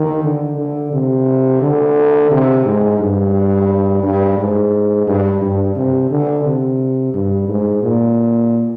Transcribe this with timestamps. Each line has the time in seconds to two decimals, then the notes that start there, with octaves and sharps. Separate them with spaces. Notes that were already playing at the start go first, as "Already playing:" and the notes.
Already playing: D#3
0.23 D3
0.58 D3
0.92 C3
1.61 D3
2.31 C3
2.65 G#2
2.99 G2
4.03 G2
4.38 G#2
5.07 G2
5.41 G2
5.76 C3
6.10 D3
6.45 C3
7.14 G2
7.48 G#2
7.83 A#2